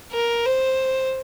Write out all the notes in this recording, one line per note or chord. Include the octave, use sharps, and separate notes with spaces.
A#4
C5